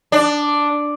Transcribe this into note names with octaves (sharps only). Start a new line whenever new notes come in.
D4